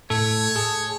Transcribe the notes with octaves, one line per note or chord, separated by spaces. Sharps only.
A2 A4 C#5
G#4 A5